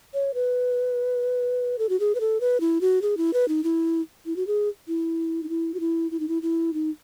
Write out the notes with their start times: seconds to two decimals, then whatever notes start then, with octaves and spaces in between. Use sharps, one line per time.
0.14 C#5
0.34 B4
1.79 A4
1.89 F#4
2.00 G#4
2.15 B4
2.20 A4
2.41 B4
2.60 E4
2.81 F#4
3.02 G#4
3.17 E4
3.34 B4
3.48 D#4
3.64 E4
4.26 E4
4.36 F#4
4.47 G#4
4.88 E4
5.43 D#4
5.49 E4
5.74 F#4
5.80 E4
6.11 E4
6.20 D#4
6.28 E4
6.42 E4
6.74 D#4